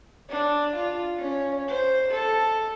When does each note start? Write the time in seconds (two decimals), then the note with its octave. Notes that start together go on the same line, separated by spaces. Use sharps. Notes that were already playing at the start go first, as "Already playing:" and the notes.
0.30 D4
0.76 F4
1.19 C#4
1.69 C5
2.11 A4